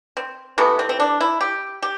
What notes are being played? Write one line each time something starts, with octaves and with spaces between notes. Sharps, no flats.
C4
C3 E3 A3 B3
C4
C4
D4
E4
G4
G4